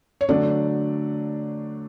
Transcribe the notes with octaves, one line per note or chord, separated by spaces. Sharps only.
C#5
D3 F#3 A3 D4 D5